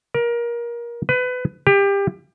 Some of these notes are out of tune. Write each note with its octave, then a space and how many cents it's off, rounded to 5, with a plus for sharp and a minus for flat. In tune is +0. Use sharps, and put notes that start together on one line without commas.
A#4 +25
B4 +25
G4 +25